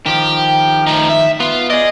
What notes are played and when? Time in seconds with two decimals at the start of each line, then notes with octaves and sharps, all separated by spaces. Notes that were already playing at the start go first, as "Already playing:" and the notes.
0.06 D#3 F3 G4
0.87 A3 D#4
1.09 E5
1.40 B3 F4
1.70 G#4 D5 D#5